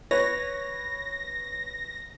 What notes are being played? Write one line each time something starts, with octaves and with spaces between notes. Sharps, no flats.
B4 C#5 A#6